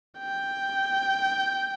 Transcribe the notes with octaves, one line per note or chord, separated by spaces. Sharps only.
G5